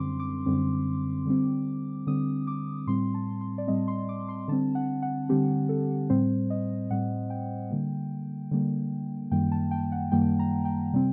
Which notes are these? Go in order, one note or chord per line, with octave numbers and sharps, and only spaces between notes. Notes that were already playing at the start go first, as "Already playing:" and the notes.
Already playing: F#2 D3 G3 C4 C6 D6
D6
F#2 D3 G3 C4
D3 G3 C4
D3 G3 C4 D#6
D6
A2 G3 C4 C6
A5
C6
D5
A2 G3 C4 D#5
C6
D6
C6
D3 G3 C4 A5
F#5
F#5
D3 G3 C4 G4
A4
A2 G3 C4 C5
D#5
A2 G3 C4 F#5
G5
D3 G3 A#3
D3 G3 A#3
F#2 D#3 G3 A#3 G5
A5
G5
F#5
F#2 D#3 G3 A#3 G5
A#5
G5
C3 G3 C4